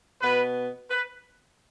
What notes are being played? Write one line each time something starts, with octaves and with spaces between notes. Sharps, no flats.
B2 B3 B4
B4